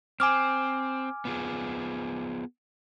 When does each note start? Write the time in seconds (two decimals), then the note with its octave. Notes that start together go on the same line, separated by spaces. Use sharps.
0.20 C4 G#5 D6 F6
1.25 B3 F4 G#4